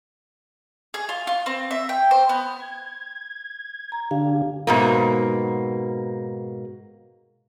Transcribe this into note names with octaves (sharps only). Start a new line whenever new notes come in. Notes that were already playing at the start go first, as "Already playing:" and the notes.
G#4
F4
F4
C4
E5
G5
C5
B3
G#6
A#5
D3 D4 G4 F5
G#2 B2 A#3